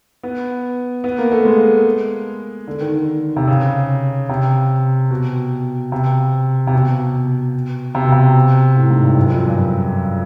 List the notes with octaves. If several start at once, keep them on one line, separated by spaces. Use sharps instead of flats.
B3
B3
A#3
A3
G#3
D3
D#3
D3
C3
C#3
C3
B2
C3
C3
B2
C3
B2
C3
A2
G#2
G2
F#2
F2
F#2
G2